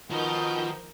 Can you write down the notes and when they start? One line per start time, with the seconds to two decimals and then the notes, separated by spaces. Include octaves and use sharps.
0.10 B2 D#3 F3 D#4 A#4 G6